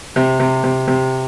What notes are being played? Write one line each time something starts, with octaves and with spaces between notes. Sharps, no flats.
C3
C3
C3
C3